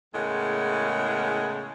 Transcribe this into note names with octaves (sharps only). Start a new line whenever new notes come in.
E2 A2 C#3 G#3 A#4 F#5